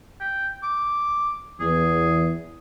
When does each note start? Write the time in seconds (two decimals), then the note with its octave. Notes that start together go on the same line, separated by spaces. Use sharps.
0.21 G5
0.63 D6
1.60 E2 G#4